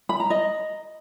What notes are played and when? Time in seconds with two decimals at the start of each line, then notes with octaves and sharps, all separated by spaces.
0.09 B5
0.20 A#5
0.30 D#5